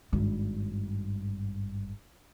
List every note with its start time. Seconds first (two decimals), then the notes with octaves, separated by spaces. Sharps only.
0.12 G#1 G2